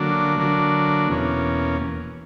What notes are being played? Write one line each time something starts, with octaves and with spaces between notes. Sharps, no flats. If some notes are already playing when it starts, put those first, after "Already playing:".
Already playing: D3 F#3 A#3 D4
D3 F#3 A#3 D4
E2 B2 A#3 C#4